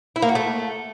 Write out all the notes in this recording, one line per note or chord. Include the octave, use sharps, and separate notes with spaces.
E4
A#3
F#4
A3